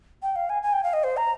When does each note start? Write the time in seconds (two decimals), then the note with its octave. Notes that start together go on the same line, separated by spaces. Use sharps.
0.23 G5
0.36 F5
0.50 G#5
0.63 G#5
0.73 G5
0.83 F5
0.93 D#5
1.04 C5
1.17 A#5